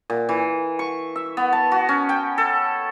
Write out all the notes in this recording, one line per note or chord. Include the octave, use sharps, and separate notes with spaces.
A#2
E3
C#6
E5
B3
A5
F#4
C#4
G5
A4